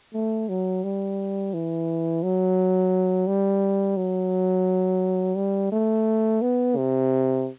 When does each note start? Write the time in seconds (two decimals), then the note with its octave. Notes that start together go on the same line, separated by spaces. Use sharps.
0.14 A3
0.49 F#3
0.84 G3
1.54 E3
2.23 F#3
3.27 G3
3.97 F#3
5.37 G3
5.72 A3
6.42 B3
6.77 C3